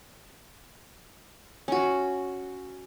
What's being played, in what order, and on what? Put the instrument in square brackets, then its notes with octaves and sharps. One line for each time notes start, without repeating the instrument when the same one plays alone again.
[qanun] C#4 F#4